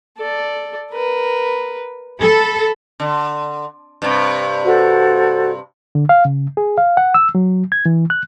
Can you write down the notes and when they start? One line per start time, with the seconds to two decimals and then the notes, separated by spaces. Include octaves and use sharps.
0.18 A4 D5
0.91 A#4 B4
2.21 A4 B5
3.00 D3
4.02 G2 C3
4.65 F#4 A4 C5
5.95 D3
6.09 F5
6.25 C#3
6.57 G#4
6.78 F5
6.97 F#5
7.14 E6
7.35 F#3
7.72 G#6
7.86 E3
8.10 F#6